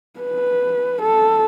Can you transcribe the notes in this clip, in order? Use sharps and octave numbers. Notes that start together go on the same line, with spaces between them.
B4
A4